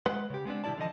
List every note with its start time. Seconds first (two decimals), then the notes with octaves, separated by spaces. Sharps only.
0.06 G#3 B4 F#5 C6
0.30 C#3 G4
0.45 G#3 B3 C4 D4
0.64 C3 D#3 G3 E4 D5 A5
0.78 D3 E3 F3 D#5 A5